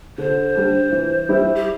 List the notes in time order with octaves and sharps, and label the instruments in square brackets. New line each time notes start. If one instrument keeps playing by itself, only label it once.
[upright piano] D3 [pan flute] C5
[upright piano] G3 D4
E3
G3 E4
[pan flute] G4